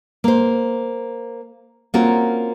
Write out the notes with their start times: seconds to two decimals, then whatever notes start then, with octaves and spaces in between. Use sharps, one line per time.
0.24 A#3 C5
1.94 A#3 C4 C#4 F4 F#4 A#4